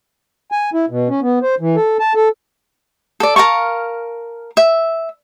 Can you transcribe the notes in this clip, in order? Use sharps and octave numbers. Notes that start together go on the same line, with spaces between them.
G#5
E4
B2
C#4
B3
C5
E3
A4
A5
A4
A4 D5
A#4 F5 A5 C#6
E5